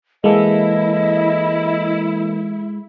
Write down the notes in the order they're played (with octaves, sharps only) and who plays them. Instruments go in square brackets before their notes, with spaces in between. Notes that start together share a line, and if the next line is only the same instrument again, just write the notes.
[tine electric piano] E3 A#3 A4 [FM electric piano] G#3 [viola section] E4 [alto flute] D#5